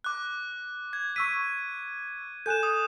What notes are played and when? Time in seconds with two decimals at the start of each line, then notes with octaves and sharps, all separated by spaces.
0.04 D6 F#6
0.93 G#6
1.16 C#6 E6 B6 D#7
2.46 A4 G#5 F#6 G6 E7
2.63 D#6